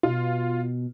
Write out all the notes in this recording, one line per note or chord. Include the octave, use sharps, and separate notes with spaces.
B2 F4